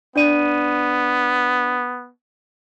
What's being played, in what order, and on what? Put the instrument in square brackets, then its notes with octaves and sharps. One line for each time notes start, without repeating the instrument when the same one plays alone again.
[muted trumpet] B3 [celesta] D4 D5 D#7